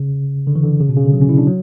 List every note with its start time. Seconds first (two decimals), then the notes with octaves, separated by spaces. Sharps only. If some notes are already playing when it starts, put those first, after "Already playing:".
Already playing: C#3
0.47 D3
0.55 E3
0.64 D3
0.80 C#3
0.89 B2
0.97 C#3
1.05 D3
1.13 F#3
1.21 C#4
1.29 E4
1.38 D4
1.47 F#3